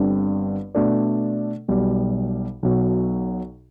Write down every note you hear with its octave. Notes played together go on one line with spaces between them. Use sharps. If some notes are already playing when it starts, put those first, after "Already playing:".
Already playing: G1 G2 D3 G3 C4
B2 A3 D4 A4 D5
B1 B2 G3
B1 B2 F#3